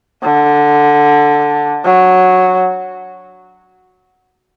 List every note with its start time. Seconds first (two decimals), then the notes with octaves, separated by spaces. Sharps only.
0.23 D3
1.84 F#3